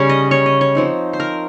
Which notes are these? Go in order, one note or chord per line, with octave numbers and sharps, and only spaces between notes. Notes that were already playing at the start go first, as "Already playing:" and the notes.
Already playing: C#3 G3 C#4 C#5
D#5
C#5
D#5
C#5
F3 C4 D#4
C5
A#4